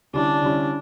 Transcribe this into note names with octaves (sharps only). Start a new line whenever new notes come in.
D3 G3 C#4 D4 E4
D3 G3 C#4 E4